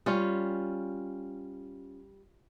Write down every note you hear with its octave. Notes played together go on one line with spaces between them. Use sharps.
G3 C#4 F4